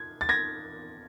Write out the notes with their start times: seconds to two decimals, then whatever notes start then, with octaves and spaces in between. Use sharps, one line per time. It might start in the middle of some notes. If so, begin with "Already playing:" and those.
Already playing: G#6
0.21 A6
0.29 G#6 A#6